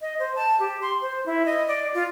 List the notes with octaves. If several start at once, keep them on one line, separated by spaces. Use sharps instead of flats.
D#5
C5
A5
G4
C6
C5
E4
D#5
D5
F4